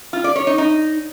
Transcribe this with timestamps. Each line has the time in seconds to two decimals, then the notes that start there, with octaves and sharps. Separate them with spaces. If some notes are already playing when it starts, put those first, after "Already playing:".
0.13 F4
0.24 D5
0.36 C#5
0.47 D#4
0.58 D#4